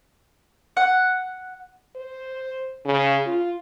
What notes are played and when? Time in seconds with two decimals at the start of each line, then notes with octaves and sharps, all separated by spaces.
0.77 F#5
1.96 C5
2.85 C#3
3.26 F4